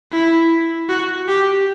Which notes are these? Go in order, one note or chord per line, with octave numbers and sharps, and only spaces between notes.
E4
F#4
G4